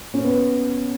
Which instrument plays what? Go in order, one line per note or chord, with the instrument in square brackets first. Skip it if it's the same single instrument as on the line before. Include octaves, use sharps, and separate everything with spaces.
[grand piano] C#4
B3